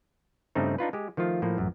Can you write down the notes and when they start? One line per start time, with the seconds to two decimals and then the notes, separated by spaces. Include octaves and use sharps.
0.55 G2 C#3 G3 A3 C4 D#4
0.78 D4 D#4 F4 B4
0.93 G#3 G4
1.17 D#3 F3 A3 F4
1.42 A2 F3 A#3
1.58 A1 F#2